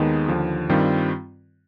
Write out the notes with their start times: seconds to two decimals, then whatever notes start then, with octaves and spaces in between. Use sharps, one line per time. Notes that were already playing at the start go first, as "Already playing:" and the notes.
Already playing: D#2 D#3 G#3 B3 D#4
0.28 D#2 D3 F3
0.69 G2 D#3 G3 C4 F4